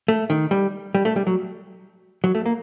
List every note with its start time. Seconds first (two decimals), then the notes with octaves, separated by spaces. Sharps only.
0.08 A3
0.30 D#3
0.51 G3
0.95 G3
1.05 A3
1.16 G3
1.27 F#3
2.24 F#3
2.35 A3
2.46 A#3